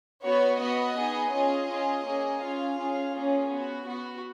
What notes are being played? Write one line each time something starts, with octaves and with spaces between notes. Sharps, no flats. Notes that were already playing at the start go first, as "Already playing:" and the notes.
B3 F#4 C#5
B3 F#4 D#5
B3 D#4 G#4
C#4 F4 G#4 D#5
C#4 F4 G#4
A#3 C#4 G#4
C#4 F4 G#4 F5
C#4 F4 G#4
A#3 C#4 F4 G#4
B3 F#4
B3 F#4